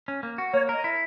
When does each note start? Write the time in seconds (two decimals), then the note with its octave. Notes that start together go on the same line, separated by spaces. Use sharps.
0.08 C#4
0.23 A#3
0.38 F#4
0.53 A#3 C#5
0.69 A#4
0.74 D#5
0.84 E4